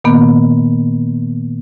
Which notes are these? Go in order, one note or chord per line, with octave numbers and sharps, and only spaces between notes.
A#2 D#3 A#3 B3